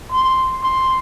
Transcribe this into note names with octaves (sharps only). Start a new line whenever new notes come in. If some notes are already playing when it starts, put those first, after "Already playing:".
C6
C6